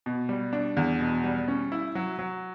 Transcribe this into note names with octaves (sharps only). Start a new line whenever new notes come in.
B2
G3
D4
E2
B2
G3
C#4
E4
F#3
F#3